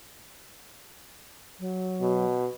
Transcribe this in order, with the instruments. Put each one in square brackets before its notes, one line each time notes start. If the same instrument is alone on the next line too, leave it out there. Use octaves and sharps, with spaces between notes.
[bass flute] F#3
[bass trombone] B2